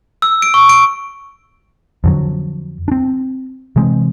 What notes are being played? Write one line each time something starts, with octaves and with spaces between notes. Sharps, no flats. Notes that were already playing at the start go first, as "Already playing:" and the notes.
E6
D7
C#6
D7
F2 D3 F#3
C4 D4
C3 E3 G#3 C4